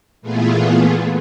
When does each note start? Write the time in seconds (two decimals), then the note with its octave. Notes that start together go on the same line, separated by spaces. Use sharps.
0.22 A#2 E3 A3 B3 F4 G#4